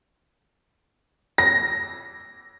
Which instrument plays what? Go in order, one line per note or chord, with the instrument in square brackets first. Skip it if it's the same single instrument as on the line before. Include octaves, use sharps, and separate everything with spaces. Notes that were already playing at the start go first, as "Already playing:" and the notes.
[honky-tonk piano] A#6